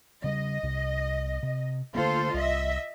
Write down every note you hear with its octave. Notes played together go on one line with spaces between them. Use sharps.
C#3 G3 D#5
C2 C3
C3
D3 A3 A#3 F4 A4 C5
C2 D#5 E5